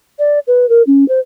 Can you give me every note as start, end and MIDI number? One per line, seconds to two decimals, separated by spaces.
0.19 0.39 74
0.47 0.68 71
0.69 0.82 70
0.87 1.07 61
1.08 1.20 72